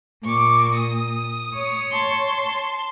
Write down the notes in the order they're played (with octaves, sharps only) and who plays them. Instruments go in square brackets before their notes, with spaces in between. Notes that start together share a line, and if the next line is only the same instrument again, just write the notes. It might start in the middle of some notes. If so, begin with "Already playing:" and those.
[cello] A#2 [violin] C#6 D6
[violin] D#6
[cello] C#5
[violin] A5 C6